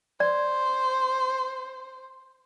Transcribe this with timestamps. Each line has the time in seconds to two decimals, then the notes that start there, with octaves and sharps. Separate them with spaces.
0.20 C5 D5